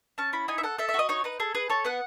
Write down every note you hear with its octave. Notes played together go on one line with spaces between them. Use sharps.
C#4 A5
E4 B5
D#4 G#5
E5
A4 F#5
A4 E5
E5
F#4
D#5
D#4 C#5
D#4 B4
G#4 A4
G#4 B4
A4 C#5
B3 F#5